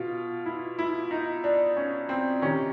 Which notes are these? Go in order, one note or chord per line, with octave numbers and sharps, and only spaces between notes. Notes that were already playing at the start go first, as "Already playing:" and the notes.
Already playing: B2 F4
E4
E4
D#4
D4
C#4
C4
C3 D#3 C#4